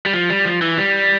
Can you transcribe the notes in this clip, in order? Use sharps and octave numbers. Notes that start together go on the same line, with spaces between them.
G3
F3
G3
F3
E3
G3